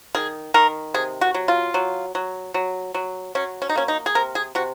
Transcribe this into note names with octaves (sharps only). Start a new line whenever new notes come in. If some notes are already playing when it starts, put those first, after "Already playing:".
D#3 G#4
D#3 A#4
C3 G#4
F#4
F#3
F4
F#3
F#3
F#3
F#3
F#3 C#4
C#4
D#4
A#3 C#4
D#4
G#4
C3 A#4
G#4
C3 F#4